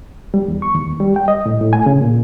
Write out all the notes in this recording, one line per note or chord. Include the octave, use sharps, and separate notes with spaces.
G3
E2
C#6
D#2
G3
G5
D#5
A2
A2
G#5
C#3
A#2